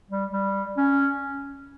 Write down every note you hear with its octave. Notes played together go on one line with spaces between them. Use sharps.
G3
G3
C#4